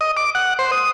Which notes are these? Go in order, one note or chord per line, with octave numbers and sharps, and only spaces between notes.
D#5
D6
F#5
C5
D#6